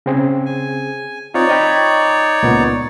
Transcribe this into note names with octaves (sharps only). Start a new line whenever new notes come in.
C#3 C4 G#4
G#5
C4 D#4 F4 C#5 D5
D#5 G5 B5
C#2 A#2 B3